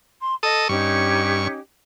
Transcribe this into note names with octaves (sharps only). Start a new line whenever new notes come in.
C6
A4 D#5 D#6
G2 C#4 D#4 G4 C#6